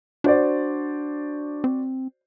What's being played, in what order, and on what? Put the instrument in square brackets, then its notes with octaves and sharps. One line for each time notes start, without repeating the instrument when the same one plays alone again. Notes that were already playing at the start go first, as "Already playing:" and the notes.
[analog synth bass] D4 [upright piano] F#4 C5 D5
[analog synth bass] C4